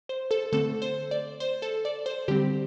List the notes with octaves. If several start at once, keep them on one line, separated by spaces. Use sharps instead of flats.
C5
A4
D3 A3 C4 A4
C5
D5
C5
A4
D5
C5
D3 G3 C4 G4